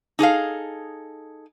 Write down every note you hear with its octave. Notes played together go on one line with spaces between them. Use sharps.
D#4 G#4 A4 F5